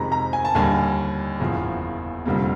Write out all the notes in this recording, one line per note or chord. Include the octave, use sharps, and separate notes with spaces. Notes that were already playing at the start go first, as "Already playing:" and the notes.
Already playing: F2 C3 D#3 G#3 A#5 B5
A#5
G#5
A5
D#2 D3 G3 A#3 G#5
F#1 E2 C#3 F3
F1 F2 D3 G3 A#3